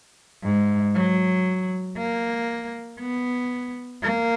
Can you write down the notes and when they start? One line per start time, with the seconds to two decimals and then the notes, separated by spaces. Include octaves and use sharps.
0.44 G#2
0.95 F#3
1.97 A#3
3.00 B3
4.03 A#3